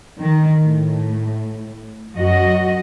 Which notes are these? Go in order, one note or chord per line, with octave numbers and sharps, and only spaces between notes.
D#3
A2
F#2 F#4 D#5